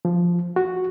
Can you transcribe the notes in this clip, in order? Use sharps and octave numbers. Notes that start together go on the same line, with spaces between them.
F3
F#4